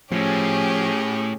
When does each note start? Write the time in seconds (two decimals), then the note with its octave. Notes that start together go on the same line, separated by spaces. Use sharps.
0.11 A2 F3 C#4 G4 G#4